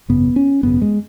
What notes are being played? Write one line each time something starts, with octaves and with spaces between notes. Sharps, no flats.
G#1 F#2 C#3 B3
C#4
G#1 F#2 C#3 B3
G#3